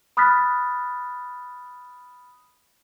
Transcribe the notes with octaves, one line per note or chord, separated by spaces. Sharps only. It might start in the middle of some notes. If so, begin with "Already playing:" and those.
B5 D#6 F6 F#6 A6 B6